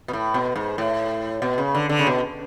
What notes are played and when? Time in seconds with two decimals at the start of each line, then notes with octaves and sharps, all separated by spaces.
0.08 B2
0.13 A2
0.34 B2
0.56 G#2
0.78 A2
1.42 B2
1.58 C#3
1.75 D3
1.89 D3
1.99 C#3
2.06 B2